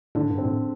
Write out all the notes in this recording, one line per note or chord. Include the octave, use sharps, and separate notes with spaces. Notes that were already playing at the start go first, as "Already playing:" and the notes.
A2 D3
G2
C4
A2